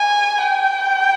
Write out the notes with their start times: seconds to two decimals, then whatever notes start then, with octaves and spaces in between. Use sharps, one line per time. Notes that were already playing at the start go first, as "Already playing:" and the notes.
Already playing: G#5
0.41 G5